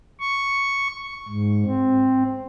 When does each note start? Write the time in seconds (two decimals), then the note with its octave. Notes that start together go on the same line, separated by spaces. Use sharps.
0.20 C#6
1.29 G#2
1.65 C4